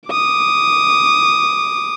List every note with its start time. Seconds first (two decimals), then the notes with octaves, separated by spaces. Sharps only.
0.10 D6 D#6